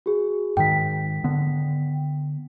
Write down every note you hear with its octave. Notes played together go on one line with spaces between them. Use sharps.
F#4 G#4
G#2 D#3 G5 B6
D3 B3